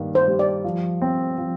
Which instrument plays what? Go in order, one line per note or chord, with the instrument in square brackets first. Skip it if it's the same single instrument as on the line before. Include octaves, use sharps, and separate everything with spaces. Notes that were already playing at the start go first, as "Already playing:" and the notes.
Already playing: [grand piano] G2 D#3 A#3
[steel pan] C5
[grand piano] G3
[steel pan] D5
[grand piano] F3
C4
F3